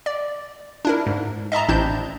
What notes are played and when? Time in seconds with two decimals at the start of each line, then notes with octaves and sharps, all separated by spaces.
0.06 D5
0.85 D4 E4 A#4
1.07 G#2
1.52 D#5 E5 A5 A#5
1.68 A1 C4 D4 E4 A5 G6